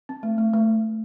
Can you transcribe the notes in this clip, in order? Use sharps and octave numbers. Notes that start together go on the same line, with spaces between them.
C4
A3
A3
A3